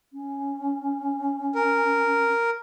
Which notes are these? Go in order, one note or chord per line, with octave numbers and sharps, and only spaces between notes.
C#4
A#4